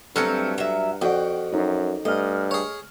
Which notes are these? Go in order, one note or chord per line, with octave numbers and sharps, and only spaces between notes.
G2 F#3 A3 C4 A4 F6 F#6 C#7
F#3 E5
F2 F#4 D5 F#5 G5
F#2 D#4
G2 A3 D#5 F6
G#4 C#5